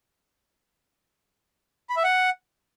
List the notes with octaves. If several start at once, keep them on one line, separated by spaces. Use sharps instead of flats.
B5
E5
F#5